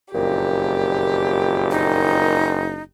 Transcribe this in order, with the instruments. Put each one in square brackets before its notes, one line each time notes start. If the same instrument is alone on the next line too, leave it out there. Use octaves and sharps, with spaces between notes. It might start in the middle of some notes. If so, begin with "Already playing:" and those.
[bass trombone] F#1 [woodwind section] F2 A#2 D#3 [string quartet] G4
[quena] D#4